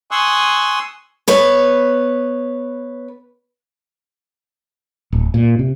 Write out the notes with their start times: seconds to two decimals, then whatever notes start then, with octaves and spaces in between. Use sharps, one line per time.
0.11 G#5 C6 C#6 D#6 E6 F#6
1.28 B3 B4 C#5
5.13 D1
5.34 A#2
5.59 C3